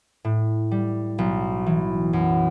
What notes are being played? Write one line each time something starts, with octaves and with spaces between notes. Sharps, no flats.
A2
G3
B1
E3
F#2